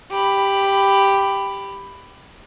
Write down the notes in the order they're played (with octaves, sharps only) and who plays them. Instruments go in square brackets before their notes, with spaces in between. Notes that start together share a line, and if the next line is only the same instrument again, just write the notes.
[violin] G4 B5